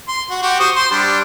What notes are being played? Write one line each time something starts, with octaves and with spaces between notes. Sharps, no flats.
C6
F#4
F#4 G4
C5 C#6 D#6
C5 C6
G3 D4